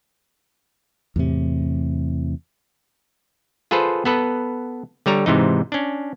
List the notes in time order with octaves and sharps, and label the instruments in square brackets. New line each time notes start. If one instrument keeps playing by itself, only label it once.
[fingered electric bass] E2 A2 C3
[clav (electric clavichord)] F4 G#4 A4 B4 C5
B3 A4 B4
D3 G3 C#5 A#5
G#2 C3 E3 D#4
C#4 D4